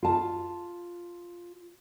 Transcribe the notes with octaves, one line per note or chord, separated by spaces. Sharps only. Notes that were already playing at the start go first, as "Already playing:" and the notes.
F4 A5